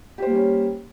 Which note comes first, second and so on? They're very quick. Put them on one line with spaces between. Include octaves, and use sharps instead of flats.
G4 C5 A#3 G3 C#4